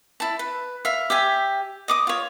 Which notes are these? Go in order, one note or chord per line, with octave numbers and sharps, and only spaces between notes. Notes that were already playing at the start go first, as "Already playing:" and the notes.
E4 A5
B4
E5 F5
G4 E5 G#5
D#5 D6 D#6
F4 C#5